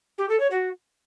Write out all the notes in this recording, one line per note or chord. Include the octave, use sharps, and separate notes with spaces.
G4
A4
C#5
F#4